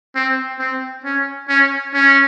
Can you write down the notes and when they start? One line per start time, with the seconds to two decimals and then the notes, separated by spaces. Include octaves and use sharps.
0.15 C4
0.59 C4
1.04 C#4
1.49 C#4
1.94 C#4